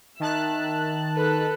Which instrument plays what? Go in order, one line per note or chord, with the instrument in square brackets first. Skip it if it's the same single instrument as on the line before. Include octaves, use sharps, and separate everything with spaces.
[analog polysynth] D#3 A5 F#6 [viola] E5
[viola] A4 B4